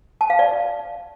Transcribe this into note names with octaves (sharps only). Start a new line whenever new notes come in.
A5
F5
D5